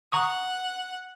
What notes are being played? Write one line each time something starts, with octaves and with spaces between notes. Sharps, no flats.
F#5 A#5 C#6 D#6